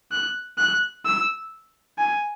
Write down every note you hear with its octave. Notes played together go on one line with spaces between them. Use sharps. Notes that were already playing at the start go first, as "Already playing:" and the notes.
F#6
F#6
E6
G#5